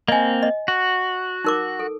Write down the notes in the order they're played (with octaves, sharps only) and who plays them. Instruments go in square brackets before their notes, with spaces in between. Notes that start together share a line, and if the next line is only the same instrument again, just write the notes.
[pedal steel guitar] A#3 C4 [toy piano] D#5 G#5
[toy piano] D#5
[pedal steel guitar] F#4
[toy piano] D#4 A#4 D6
A4